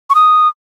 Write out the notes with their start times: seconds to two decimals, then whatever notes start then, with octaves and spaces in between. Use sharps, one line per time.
0.10 C#6
0.15 D#6